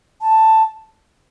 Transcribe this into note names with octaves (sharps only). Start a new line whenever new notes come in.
A5